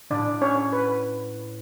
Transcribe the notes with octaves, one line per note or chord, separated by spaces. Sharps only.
A2 D4 D5
C#4 C#5
B4